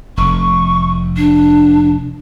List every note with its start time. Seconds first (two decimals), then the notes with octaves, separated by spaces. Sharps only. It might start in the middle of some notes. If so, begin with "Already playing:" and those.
0.17 F1 C#6
1.17 D4